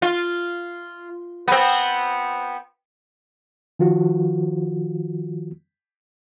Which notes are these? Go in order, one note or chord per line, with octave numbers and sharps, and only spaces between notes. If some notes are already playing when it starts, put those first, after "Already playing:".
F4
B3 C4
D#3 F3 F4 F#4